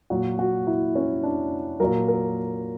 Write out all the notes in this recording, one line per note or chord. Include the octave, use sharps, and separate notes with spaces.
A#2 F#3 F#4
F#4
E4
C#4
D4
A#2 F#3 A#4
A#4